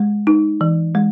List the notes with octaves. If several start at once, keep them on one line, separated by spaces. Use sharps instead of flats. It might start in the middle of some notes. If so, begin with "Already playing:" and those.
Already playing: G#3
D#4
E3
G#3